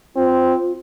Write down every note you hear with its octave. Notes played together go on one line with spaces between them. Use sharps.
C4 F4